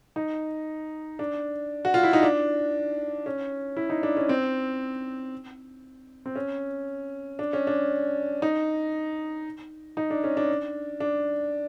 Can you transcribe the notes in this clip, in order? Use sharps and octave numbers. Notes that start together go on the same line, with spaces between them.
D#4
D4
F#4
F4
E4
D#4
D4
C#4
E4
D#4
D4
C#4
C4
C4
C#4
D4
C#4
D4
D#4
D#4
D4
C#4
D4
D4